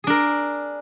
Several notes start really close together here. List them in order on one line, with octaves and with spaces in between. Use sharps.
G#4 D4 A#4